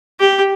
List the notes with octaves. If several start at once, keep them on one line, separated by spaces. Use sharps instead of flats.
G4